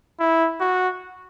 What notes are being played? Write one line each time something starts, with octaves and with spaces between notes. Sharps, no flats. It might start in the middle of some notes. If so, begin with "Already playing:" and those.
E4
F#4